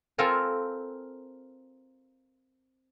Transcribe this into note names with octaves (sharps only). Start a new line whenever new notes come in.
C4 F4 A4 A#4 F5 G#5